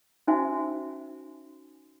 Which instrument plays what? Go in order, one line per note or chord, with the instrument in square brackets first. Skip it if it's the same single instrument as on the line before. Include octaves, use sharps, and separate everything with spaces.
[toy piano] C#4 D#4 F#4 C5 E5 G#5